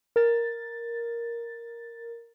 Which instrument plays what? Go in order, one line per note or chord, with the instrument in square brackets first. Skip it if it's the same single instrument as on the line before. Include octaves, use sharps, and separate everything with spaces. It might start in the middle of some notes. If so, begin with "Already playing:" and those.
[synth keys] A#4 A6